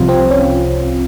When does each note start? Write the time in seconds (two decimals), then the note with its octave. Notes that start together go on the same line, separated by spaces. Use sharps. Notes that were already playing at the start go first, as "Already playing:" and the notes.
Already playing: C2 C3 F3 F4
0.09 C4
0.31 C#4